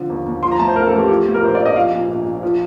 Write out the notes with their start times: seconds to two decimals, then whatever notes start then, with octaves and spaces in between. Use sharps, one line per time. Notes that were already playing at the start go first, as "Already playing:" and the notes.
Already playing: D3 F3
0.10 D#2
0.26 D#2
0.43 F3 C6
0.51 A#5
0.59 A2 A5
0.68 C5
0.76 A1 A#4
0.87 A4
0.93 A1
0.98 G4
1.09 F3
1.26 A2
1.34 A#4
1.42 A#1 C5
1.55 A#1 D5
1.65 D#5
1.76 F3 F5
1.92 A#2
2.09 A#1
2.26 A#1
2.43 F3